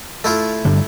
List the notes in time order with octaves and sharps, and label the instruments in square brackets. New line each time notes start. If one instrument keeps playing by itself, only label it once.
[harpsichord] A3 E4 F4
[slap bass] G2 D3 G3